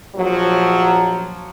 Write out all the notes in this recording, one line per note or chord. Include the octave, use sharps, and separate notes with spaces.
A#1 F3 F#3